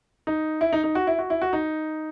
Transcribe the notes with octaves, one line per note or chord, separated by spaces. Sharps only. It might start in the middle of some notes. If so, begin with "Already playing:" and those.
D#4
E4
D#4
D#4
F#4
E4
F#4
E4
F#4
D#4